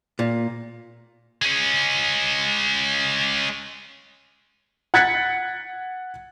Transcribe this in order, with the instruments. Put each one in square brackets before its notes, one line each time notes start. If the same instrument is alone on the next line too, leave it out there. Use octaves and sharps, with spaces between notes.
[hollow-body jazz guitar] A#2
[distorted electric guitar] G#3 C#4
[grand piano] F#5 F#6 G#6 A6 B6 C#7